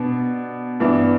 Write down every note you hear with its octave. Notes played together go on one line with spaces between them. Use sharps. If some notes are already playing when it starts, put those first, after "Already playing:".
Already playing: B2 B3 D4
G2 E3 B3 D4